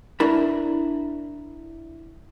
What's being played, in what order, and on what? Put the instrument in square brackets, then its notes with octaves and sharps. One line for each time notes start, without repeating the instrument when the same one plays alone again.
[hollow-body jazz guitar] D4 E4 A#4 B5